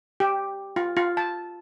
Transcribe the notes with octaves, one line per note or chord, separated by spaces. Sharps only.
G4
F4
F4
A5